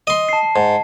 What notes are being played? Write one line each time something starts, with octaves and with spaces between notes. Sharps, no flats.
D#5 C6
A5 C7
G#2